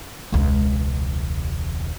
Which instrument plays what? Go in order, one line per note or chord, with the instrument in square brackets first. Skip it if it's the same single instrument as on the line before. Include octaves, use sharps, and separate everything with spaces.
[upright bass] E1 C#2